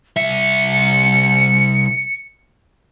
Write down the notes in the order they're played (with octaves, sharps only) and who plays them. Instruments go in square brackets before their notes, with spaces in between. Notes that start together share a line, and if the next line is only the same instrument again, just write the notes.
[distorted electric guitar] C2 E5 [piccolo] C#7